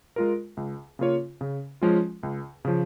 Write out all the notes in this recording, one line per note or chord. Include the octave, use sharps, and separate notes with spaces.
G#3 F4 A#4
C#2
C#3 A#3 F4 C#5
C#3
F3 G#3 C#4 F4
C#2
C#3 F3